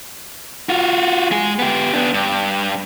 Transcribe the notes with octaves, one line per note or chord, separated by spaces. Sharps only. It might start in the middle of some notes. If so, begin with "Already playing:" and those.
F4 F#4
G#3 G#4
B3 G4
B3 D4
G2